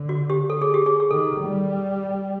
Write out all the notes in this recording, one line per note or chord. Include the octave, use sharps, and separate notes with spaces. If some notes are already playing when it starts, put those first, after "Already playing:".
Already playing: D3
F#4
G4
A4
G#4
G4
G#4
G#4
D#3 A4
G3